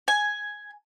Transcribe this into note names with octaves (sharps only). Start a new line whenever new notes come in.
G#5